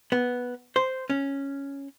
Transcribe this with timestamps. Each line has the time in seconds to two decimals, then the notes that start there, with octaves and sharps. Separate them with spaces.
0.12 B3
0.76 C5
1.10 C#4